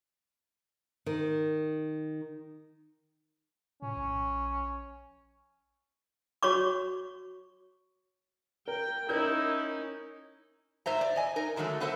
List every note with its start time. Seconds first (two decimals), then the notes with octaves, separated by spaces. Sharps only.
1.06 D#3
3.82 A2 C#4
3.97 A#1
6.43 F#4 C#5 C#6 D6
8.68 A#4 G5
9.09 C#4 D#4 E4 A#4 G6
10.86 G#2 C5 E5 A#5
11.01 D5
11.16 D#5 G#5
11.36 D#4 A#4
11.56 D3 D#3 F#3 G#3 A3
11.80 B3 A4 C5 E5